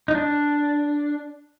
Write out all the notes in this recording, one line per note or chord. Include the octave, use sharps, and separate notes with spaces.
D#4
D4